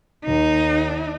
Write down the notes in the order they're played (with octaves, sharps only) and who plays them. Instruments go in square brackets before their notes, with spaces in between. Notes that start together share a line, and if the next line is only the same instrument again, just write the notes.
[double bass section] D#2 [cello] D#4